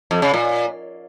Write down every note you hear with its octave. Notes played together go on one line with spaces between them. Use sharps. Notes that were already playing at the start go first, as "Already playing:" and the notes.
F2
C#3
A#2